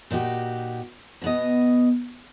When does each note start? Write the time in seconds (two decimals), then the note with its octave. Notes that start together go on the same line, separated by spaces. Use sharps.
0.11 A#2 D#4 F#4 G4
1.22 B2 B3 D#5